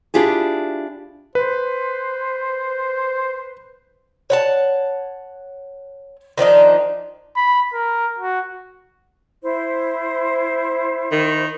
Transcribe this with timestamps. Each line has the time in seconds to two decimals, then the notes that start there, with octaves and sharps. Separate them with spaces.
0.14 D4 E4 F4 G4 G#4
1.35 B4 C5
4.30 C#5 F#5 A5
6.38 D#3 F3 D4 D#4
7.36 B5
7.73 A#4
8.19 F#4
9.43 E4 C5
11.12 D#3